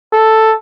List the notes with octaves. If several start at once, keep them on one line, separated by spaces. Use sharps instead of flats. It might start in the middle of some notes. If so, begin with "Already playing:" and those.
A4